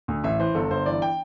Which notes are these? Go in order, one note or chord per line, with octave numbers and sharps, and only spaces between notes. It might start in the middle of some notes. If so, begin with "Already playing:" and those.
D2
A1 E5
E3 C5
G1 A4
G1 C5
E3 D5
G5